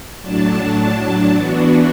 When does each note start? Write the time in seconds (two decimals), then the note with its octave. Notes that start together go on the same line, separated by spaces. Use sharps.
0.22 A2 F#3 D4 A5
1.35 E3 B3 D4 F#4